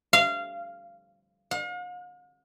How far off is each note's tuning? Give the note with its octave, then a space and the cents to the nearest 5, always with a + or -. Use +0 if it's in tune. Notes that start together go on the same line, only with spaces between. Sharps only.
F5 -20
F5 +45